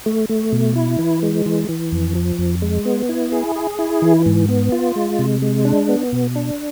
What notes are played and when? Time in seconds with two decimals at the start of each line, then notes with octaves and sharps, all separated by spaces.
0.06 A3
0.29 A3
0.53 B2
0.75 E4
0.99 E3
1.23 G#3
1.46 E3
1.69 E3
1.92 F2
2.15 F3
2.39 F2
2.62 G#3
2.85 B3
3.09 E4
3.32 G#4
3.56 G#4
3.79 E4
4.02 E3
4.26 G#2
4.48 B3
4.72 F4
4.96 G#3
5.19 C3
5.42 G#3
5.65 D4
5.89 B3
6.12 B2
6.36 D4